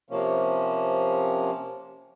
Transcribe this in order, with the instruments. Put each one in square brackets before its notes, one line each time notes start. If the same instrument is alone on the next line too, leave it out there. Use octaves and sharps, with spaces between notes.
[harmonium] C3 F3 A#3 C#4